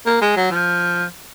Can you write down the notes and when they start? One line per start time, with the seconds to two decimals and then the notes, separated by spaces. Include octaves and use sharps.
0.06 A#3
0.21 G#3
0.36 F#3
0.51 F3